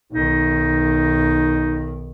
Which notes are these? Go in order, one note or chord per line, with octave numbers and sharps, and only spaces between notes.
B1 D#3 D#4